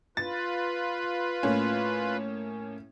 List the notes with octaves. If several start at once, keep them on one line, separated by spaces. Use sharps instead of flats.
F4 B4 A6
A2 A#3 C#4